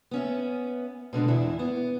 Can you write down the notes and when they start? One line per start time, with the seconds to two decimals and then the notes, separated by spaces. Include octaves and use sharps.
0.11 B3 C#4 E5
1.13 B2 D3 G#3 D4
1.28 E2 E3 E4
1.59 B3